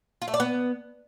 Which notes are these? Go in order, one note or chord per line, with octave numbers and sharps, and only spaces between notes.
F4
A3
D5
B3